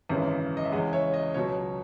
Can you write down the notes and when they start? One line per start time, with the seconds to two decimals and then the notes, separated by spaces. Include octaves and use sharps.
0.09 G#1 F#2 C#3 E3
0.57 D#5
0.65 E5
0.72 G#3 D#5 F#5
0.75 E2 C#3
0.93 C#5 E5
1.14 D#5
1.34 C#2 B2 F#3 C#5